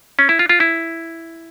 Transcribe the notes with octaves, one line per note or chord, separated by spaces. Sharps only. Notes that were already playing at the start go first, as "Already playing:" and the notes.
C#4
E4
F4
F4
E4